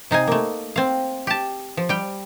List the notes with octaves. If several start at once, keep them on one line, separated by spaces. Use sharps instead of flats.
C3 D#4 F5 G#5
A3 A#3
C4 F5
G4 A5
F3
G3 G5